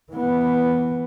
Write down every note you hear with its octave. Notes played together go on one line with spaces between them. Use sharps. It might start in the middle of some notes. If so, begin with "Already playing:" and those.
E3 B3